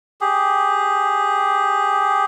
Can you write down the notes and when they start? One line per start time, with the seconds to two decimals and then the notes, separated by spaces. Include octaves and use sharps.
0.21 G4 G#4